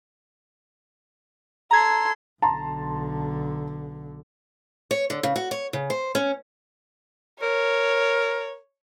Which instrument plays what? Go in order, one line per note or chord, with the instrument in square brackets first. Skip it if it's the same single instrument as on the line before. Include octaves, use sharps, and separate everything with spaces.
[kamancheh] A4 C6 [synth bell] A#5 G#6
[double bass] B1 D3 [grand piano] A5 A#5 C6
[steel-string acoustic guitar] C#5
D3
C#3
F#4
C#5
C#3
C5
C#4
[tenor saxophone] A#4 [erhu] C#5